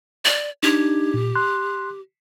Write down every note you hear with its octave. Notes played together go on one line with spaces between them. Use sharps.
D5
D4 D#4 G4 G#6
A#2
C6 F#6